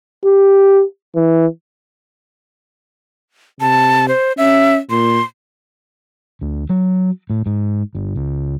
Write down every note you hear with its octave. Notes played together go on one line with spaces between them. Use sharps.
G4
E3
C3 A5
C5
C#4 E5
A#2 C6
D2
F#3
A2
G#2
G1
C#2